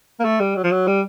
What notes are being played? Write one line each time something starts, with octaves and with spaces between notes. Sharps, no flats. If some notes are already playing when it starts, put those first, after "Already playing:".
A#3
A3
G3
F#3
F3
F#3
G3